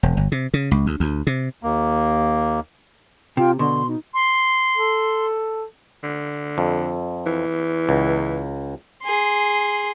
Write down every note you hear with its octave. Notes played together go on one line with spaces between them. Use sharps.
E1
G1
C3
C#3
C#2
D2
D2
C3
D#2 A#3
C3 F4 G5
B2 D3 C6
D#4
C6
A4
D3
F2
E3
C#2
G#4 C6